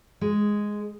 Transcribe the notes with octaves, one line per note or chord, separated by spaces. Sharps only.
G#3